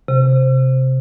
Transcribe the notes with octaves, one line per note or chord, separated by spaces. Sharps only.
C3